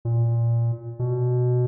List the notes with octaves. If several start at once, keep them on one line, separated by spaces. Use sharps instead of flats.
A#2
B2